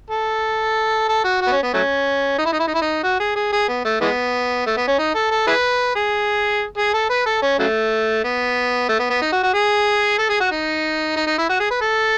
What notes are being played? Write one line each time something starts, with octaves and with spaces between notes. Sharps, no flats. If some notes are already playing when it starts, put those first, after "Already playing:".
A4
A4
F#4
F#4
B3
C#4
B3
F#3 A3 C#4
D#4
E4
D#4
E4
D#4
E4
D#4
F#4
G#4
G#4
G#4
B3
A3
E3 G#3 B3
A3
B3
C#4
D#4
A4
A4
E4 G#4 B4
G#4
G#4
A4
B4
A4
C#4
C#3 F#3 A3
B3
A3
B3
B3
D#4
F#4
F#4
G#4
A4
G#4
F#4
D#4
D#4
D#4
E4
F#4
G#4
B4
A4